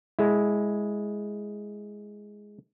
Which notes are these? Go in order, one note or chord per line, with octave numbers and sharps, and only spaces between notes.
G#3 E4